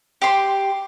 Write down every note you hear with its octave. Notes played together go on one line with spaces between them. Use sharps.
G4 C6